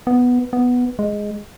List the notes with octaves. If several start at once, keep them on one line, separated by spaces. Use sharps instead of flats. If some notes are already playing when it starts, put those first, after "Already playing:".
B3
B3
G#3